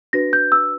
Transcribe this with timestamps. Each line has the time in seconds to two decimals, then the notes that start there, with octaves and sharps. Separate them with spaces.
0.13 D4 F#4 B4 A#6
0.33 G6
0.52 E6